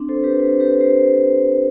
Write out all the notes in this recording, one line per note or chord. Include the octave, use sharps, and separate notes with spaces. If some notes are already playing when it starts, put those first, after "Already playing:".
Already playing: C4 D4
A4 C5
G4 B4
A4 C5
G4 B4
A4 C5